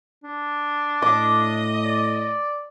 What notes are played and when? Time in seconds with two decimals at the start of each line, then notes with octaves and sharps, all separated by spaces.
0.24 D4
1.02 A2 D#5 D6
1.84 D5